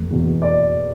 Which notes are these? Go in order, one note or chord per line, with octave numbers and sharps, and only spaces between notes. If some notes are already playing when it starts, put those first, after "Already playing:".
Already playing: F1
E2 B2
D5